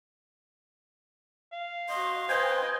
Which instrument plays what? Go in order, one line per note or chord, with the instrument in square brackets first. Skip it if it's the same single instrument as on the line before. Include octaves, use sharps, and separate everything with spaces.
[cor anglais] F5
[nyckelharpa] F#4 D#5 [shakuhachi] C6
[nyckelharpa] B4 D#5 [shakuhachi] C5 [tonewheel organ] G5 G#5